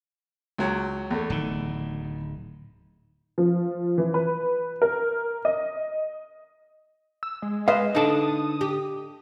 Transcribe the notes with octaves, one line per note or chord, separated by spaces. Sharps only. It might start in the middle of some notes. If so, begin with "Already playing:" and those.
C#2 F#3
E2 A3
D1 D#3
F3
E3
B4
A#4
D#5
E6
G#3
B4 C5 D#5 F5
D3 D4 D#4 A4 A5 D#6
G4